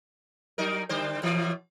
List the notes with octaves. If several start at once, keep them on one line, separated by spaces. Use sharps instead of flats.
F#3 D#4 A#4
D3 G3 C5
F#2 B2 E3